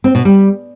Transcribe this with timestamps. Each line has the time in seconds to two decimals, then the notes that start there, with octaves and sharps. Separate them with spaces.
0.04 C4
0.15 B2
0.25 G3